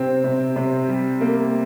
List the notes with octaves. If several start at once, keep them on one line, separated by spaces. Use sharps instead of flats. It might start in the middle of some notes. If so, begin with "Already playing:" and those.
Already playing: C3 C4
C3
C3
G3
A#3